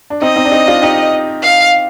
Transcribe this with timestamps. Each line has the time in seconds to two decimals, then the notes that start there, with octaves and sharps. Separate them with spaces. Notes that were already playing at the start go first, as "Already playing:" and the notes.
0.10 D4
0.22 C4 D#4 D#5
0.36 C4 D#4
0.45 D4
0.52 C4 D#4
0.67 D4 F4
0.82 D#4 G4
1.43 F5